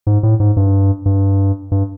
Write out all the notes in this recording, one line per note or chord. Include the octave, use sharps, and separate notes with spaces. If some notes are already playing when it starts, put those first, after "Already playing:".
G#2
A2
G#2
G2
G2
G2